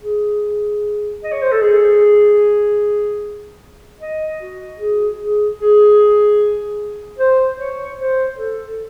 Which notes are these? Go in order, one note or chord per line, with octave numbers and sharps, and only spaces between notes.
G#4
D#5
C#5
C5
A4
G#4
D#5
F#4
G#4
G#4
G#4
C5
C#5
C5
A4